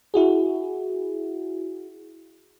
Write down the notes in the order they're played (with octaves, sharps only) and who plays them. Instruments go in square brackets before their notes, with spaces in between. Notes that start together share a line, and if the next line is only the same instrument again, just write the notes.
[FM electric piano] E4 F#4 G#4